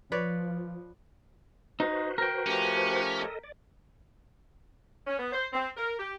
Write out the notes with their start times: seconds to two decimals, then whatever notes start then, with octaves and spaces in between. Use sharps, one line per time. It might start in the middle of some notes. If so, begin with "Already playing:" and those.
0.12 F3 B4 C#5 D5
1.80 D#4 F#4 B4 C5
2.18 A#4 G5
2.46 F3 A3 C#4 G4
3.18 A4 D#5
3.43 D5
5.07 C#4
5.18 B3
5.33 C5
5.53 C4
5.77 A#4
5.99 G4